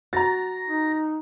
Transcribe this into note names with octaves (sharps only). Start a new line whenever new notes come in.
F#4 A#5 A6 A#6
D#4